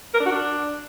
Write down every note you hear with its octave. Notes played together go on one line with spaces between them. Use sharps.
A#4
D4
F#4
D4